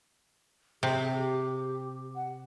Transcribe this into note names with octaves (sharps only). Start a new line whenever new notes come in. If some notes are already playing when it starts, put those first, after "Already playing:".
C3 G#4
G4
F#5